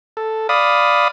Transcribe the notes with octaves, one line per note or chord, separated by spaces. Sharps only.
A4
D5 F5 B5 D#6